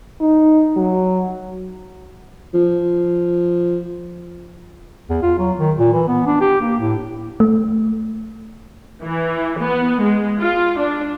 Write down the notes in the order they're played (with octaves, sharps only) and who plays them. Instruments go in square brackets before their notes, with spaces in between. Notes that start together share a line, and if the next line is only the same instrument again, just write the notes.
[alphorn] D#4
F#3
[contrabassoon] F3
[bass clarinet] E2
F4
F#3
D#3
A#2
E3
B3
D4
G4
A#3
A2
[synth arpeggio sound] A3
[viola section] E3
B3
G#3
F4
D4